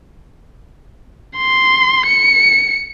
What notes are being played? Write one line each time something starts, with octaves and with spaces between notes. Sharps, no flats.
C6
C#7